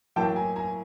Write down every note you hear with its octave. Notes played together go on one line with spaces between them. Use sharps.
A2 F#3 A#3 G5 A5
G#5 A#5
G#5 A#5